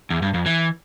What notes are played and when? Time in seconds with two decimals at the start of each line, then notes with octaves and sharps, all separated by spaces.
0.10 E2
0.22 G2
0.34 F2
0.46 E3